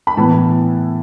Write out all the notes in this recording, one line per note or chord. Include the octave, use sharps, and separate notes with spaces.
B5
A2 E3 B3 E4 A5